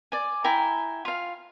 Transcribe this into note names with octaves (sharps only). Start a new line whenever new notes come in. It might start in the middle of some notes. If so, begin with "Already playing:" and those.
D5 G#5
E4 G5 G#5 A#5
F4 F5